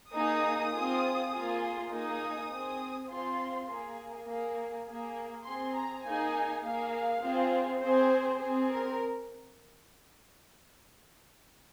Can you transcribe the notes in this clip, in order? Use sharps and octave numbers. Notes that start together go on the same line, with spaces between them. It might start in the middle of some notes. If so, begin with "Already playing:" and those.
A#3 D#4 G#4 D#6
C4 F4 G#4
A#3 F4 G#4
A#3 D#4 G#4 D#6
C4 G#4
C4 F4 G#4 C6
A#3 G#4
A#3 G#4
A#3 G#4
C4 G#4 C6
A#5
A#3 D#4 G#4 G#5
A#3 G#4 F5
C4 F4 G#4
C4 G#4 C5
C4 G#4
A#4